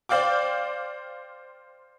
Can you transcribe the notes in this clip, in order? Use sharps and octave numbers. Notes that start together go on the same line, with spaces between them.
C5 D5 F5 G5 D6